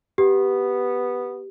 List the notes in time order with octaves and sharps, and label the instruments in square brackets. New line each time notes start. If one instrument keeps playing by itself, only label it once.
[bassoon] B3 [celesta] G4